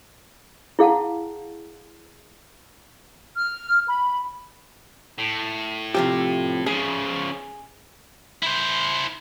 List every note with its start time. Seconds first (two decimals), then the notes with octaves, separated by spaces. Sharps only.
0.79 E4 G#4 F5 F#5 A5
3.37 F6
3.87 B5
5.18 A2
5.95 C3 F3 G4
6.66 C#3 F3 G#4
8.43 E4 C5